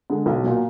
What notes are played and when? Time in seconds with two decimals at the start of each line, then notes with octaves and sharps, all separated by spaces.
0.10 D3 G#3
0.26 B1
0.44 A#2 F#3